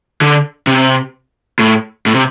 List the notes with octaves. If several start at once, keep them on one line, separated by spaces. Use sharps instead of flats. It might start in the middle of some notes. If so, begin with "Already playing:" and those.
D3
C3
A2
A2
C3